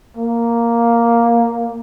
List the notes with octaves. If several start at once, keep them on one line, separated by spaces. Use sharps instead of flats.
A#3